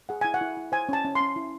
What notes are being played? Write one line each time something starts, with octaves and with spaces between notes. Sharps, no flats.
G#4 F#5
E4 G#5
F#5
E4
E4
C5 G#5
C#4 A5
C#4
C6
C#4
E4